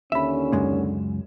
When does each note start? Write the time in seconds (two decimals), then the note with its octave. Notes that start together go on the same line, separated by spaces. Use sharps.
0.12 D#2 D3 C#4 E5 B5
0.52 C#2 F#2 G#3